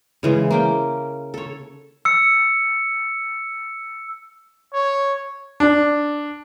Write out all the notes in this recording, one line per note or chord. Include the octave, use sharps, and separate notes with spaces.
C#3 E3 G#3
A#3 C#4 G5
A4 C#5
E6 C#7
C#5
D4